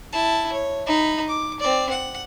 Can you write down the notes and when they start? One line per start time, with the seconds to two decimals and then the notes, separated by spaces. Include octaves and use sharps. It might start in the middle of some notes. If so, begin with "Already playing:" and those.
0.13 E4 A5
0.52 C#5
0.87 D#4 B5
1.28 D6
1.60 C4 D5
1.90 F#5